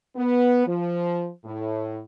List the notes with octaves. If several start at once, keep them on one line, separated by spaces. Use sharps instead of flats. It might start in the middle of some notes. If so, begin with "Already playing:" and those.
B3
F3
A2